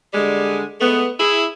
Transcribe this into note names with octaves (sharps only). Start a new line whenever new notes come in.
D3 G3 G#3
G#3 A3 B3
E4 G#4